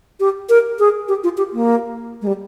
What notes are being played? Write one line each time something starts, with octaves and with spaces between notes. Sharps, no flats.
G4
A#4
G#4
G4
F4
G4
A#3
G#3
G3